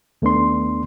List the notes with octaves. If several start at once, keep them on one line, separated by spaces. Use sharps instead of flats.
D#2 A3 B3 D4 C6